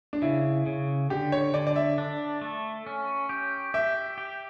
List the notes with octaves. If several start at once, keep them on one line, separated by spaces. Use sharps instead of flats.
D4
C#3 E4
C#3
D3 G4
C#5
D3 D5
D5
E5
D4
A3
C#4
G4
G4 E5
G4